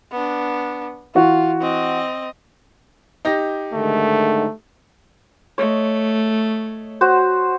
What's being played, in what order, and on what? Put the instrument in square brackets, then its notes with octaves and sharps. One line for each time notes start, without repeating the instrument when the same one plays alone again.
[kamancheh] B3 D4
[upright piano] E3 F#4 [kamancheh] F4
[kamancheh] C4 D#5
[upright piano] D#4 G4 A#6
[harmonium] G#2 D3 D#3 [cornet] A3
[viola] A3 [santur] C#5 D#5
[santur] F#4 C5